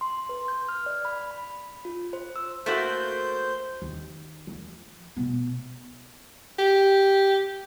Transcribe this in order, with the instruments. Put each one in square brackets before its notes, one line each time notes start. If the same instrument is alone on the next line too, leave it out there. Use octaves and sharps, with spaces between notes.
[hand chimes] C6
B4
G6
F6
D5
B5
B5
F4
C5
E6
[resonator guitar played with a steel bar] A3 A#3 F#4 [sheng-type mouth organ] C5 G6
[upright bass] D#2
F3
B2 B3
[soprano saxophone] G4